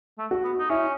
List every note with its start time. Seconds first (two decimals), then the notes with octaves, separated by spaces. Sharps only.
0.18 A3
0.31 F#4
0.44 B3
0.59 D#4
0.70 C#4 E4